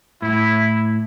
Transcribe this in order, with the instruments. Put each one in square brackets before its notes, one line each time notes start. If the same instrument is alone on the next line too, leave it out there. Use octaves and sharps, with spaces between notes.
[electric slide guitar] A2 [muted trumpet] E4